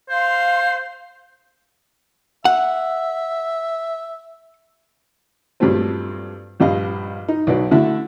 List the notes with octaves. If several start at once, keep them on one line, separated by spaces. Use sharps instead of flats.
C5 F5 C6
E5 F#5
G2 A#2 F#3 A3 C4
A#1 G2 D#5 F5
D#4
B1 B2 D#4 F#4 B4 D5
D3 A3 E4 F#4 E5